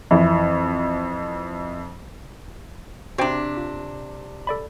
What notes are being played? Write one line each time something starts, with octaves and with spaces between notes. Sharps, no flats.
F2 E3
C3 D4 F#4 C5 G5
F4
A4 D5 B5